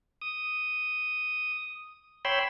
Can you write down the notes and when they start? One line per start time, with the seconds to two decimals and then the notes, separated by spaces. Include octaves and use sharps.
0.22 D#6
2.25 C#5 G5 B5 C6 E6